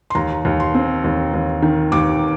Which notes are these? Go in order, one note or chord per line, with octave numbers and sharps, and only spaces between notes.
C6
D#2 A#5
D#2
C6
C4
D#2
D#2
D#3
D#2 D6